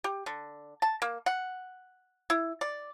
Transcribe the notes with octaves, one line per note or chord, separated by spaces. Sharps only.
G4
D3
A5
A#3
F#5
E4
D5